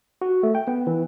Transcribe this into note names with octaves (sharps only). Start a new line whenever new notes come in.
F#4
A3
G5
B3
E3